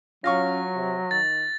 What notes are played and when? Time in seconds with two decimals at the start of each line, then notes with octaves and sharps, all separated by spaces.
0.24 F#3 C#4 F4 F5 C#6 A#6
0.76 C3
1.11 D#3 A6